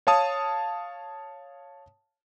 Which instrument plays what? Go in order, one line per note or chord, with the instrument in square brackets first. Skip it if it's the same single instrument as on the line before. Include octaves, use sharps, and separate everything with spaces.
[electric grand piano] C#5 F5 A5 D#6